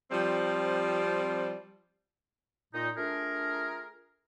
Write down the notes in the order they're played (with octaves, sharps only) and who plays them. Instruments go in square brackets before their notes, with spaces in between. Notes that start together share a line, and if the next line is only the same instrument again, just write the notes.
[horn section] F3 G3 C4
[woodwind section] A#2 D#4
A3 D4 F4 G#4 A#4